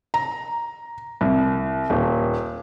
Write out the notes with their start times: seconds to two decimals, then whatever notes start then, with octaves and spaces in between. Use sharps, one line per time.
0.14 A#5
1.21 C2
1.90 D#1